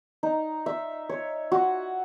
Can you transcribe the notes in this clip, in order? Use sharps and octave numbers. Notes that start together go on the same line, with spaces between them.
D#4
E5
C#5
F#4